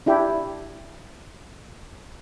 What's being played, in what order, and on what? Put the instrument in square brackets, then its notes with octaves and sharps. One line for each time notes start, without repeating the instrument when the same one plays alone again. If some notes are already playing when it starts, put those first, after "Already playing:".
[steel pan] D4 E4 G4